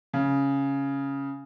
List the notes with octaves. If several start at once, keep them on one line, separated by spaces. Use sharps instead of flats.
C#3